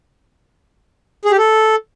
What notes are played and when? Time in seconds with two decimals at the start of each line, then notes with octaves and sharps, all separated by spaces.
1.25 G#4
1.31 G4
1.38 A4